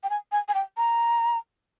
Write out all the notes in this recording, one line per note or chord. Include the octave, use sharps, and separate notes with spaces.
G5
G#5
G#5
G#5
G5
A#5